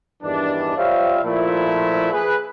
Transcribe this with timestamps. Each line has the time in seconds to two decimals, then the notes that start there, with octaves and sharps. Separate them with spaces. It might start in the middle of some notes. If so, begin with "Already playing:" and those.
0.23 E2 G2 D#3 E3 D4
0.77 G3 F4 C5 C#5 E5 F5
1.24 A#2 F3 A3 E4
2.12 G#4 B4